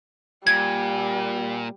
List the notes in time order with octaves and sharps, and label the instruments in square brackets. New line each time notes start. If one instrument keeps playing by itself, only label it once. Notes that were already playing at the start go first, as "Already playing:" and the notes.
[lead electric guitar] A#2 [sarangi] G3 [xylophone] G#6